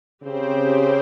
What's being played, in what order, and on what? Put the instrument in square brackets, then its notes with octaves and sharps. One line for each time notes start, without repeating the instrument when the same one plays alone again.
[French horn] C#3 [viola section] C4 G4 C5